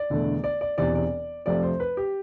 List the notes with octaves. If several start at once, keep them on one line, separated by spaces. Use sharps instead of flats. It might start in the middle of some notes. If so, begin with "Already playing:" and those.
Already playing: D5
E1 E2 D3 A3
D5
D5
E1 E2 C3 E3 D5
D5
F2 C3 F3 A3 D5
C5
B4
G4